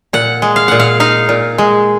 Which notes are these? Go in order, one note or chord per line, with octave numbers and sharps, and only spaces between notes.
A#2 F#5
G#3
F5
A#2 F#5
F5
D#4 F5
A#2
G#3